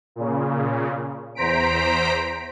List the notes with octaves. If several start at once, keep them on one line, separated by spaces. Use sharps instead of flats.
A#2 C#3
E2 C5 A#5 B6 D7